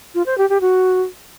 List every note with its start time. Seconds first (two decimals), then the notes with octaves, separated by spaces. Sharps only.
0.15 F4
0.26 C5
0.38 G4
0.49 G4
0.61 F#4